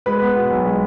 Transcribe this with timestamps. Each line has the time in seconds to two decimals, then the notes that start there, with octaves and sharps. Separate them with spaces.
0.06 G#3 B4 B5
0.21 B3
0.36 B2
0.51 B1
0.66 G#3